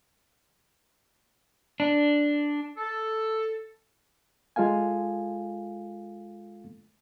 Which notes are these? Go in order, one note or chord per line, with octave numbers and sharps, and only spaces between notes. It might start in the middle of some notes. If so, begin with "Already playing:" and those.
D4
A4
G#3 F4 A4 F5 G#5